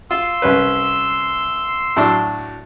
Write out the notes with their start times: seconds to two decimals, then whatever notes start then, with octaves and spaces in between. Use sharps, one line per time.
0.11 F4 C6 E6
0.42 C2 C#4 B4
1.96 A2 F#3 D4